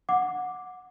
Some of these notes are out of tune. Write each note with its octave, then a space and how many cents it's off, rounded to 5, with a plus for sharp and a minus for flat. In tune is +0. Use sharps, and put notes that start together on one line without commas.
F#5 -15 D6 +0